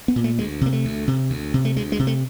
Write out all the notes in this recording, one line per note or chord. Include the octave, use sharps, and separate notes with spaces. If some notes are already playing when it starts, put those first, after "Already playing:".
B3
A#2
A3
D2 G#3
C3 A#3
A3
D2
C3
D2
C3
A3
D2 G#3
G#3
C3
A3